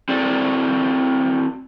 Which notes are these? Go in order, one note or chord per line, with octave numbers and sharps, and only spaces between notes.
C4 E4 F#4 A4 D5